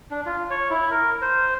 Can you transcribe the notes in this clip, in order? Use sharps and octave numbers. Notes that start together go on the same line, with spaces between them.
D4
F4
C#5
E4
A#4
C5